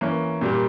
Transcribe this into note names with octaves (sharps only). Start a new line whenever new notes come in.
E3 A#3 C#4
A#2 G3 A#3